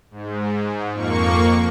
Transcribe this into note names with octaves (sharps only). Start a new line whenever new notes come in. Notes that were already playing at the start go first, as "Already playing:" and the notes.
G#2
F2 A#3 C#6